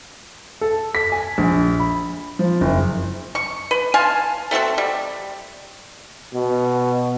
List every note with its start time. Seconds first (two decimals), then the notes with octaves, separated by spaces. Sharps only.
0.61 A4
0.95 B6
1.12 G#5
1.38 A#1
1.79 B5
2.39 F3
2.61 F#1
3.35 C#6
3.71 B4
3.94 F5 G#5 A5 C6
4.51 A3 C4 F#4 A4
4.78 G3
6.34 B2